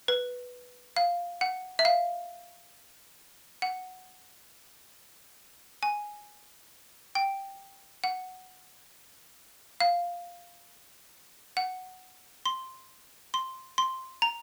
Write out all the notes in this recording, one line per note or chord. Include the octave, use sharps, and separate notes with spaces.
B4
F5
F#5
E5
F5
F#5
G#5
G5
F#5
F5
F#5
C6
C6
C6
A#5